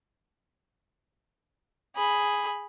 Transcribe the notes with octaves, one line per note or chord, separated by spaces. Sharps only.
G#4 B5